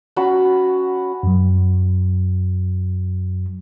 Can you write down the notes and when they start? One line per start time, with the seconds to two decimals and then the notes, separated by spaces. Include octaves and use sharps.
0.16 C#4 F#4 A5 B5
1.23 F#2 F#3